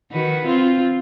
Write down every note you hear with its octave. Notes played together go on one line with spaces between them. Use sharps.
D#3 F#4 B4
C4 F4